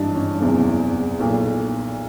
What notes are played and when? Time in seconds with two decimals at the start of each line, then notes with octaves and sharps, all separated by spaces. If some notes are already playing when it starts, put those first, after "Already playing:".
Already playing: G#1 G2 E3 D4 D#4
0.15 C#4
0.41 F#1 E2 C3
1.19 B1 A#2